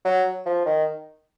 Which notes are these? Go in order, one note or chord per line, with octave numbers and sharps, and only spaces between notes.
F#3
F3
D#3